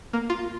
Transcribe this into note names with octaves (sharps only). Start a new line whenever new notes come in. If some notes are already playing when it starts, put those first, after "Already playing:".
A#3
F4